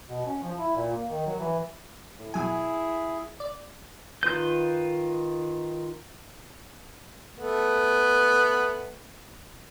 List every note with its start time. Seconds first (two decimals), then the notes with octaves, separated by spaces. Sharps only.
0.10 B2
0.26 C#4
0.43 F3
0.57 E4
0.76 A#2
0.91 A#3
1.09 D#3
1.26 F#3
1.40 E3
2.18 A2
2.34 B2 F#3 E4 G#4 G#5
3.40 D5
4.23 D#3 F4 B4 G6
7.37 A3 B3